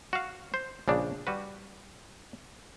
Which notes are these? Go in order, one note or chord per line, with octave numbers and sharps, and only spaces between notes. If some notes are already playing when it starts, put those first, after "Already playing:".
F#4 F5
C5
A#1 C#3 D4
G3 F#4 B4